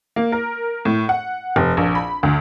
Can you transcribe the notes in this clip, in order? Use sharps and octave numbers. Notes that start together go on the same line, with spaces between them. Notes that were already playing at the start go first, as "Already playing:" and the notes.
A#3
A#4
A2
F#5
F1
A#1
B5
D2